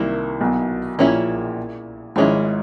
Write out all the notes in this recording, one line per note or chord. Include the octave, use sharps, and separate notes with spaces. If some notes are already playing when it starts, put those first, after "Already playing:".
Already playing: C2 C3 D#3 F#3 A#3 E4
B1 B2
A#1 A#2 A#3 C#4 E4 G#4
G#1 G#2 F3 G#3 C#4 E4